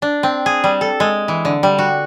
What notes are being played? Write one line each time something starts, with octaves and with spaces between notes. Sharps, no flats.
D4
C4
G#4
G3
A4
G#3
E3
D3
G3
F#4